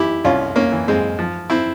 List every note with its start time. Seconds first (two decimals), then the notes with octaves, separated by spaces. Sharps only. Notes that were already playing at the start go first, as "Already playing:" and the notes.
Already playing: E3 E4 G4
0.25 C2 C#4 F4
0.56 A#3 C#4
0.72 E3
0.88 G#3 C4
1.19 F3
1.50 C4 E4